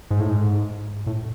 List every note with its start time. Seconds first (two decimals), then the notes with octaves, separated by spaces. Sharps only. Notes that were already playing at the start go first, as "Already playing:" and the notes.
0.11 G#2
0.20 A2
0.30 G#2
1.06 A2